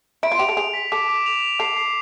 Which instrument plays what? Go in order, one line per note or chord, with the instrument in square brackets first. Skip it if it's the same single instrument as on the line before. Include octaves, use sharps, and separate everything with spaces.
[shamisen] E4 [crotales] D7
[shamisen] F4
[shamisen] G4 [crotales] F7
[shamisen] A4
[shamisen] G#4 [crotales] F7
[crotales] B6
[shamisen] A4 [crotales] D6
[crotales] D6
F7
F7
[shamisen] A4 [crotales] C7
[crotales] C7